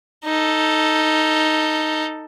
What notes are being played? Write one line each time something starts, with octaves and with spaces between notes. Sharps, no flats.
D#4 A4